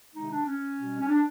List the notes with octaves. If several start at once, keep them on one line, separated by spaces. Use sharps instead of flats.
C3 D#3 G#3 D#4
D4
C#4
B2 G3
C#4
D4